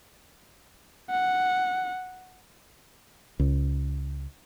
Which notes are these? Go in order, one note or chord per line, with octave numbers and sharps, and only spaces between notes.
F#5
C#2